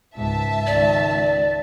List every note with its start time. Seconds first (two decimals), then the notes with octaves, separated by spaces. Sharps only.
0.16 C#2 G#2 E5 A5
0.67 C#2 D#3 D5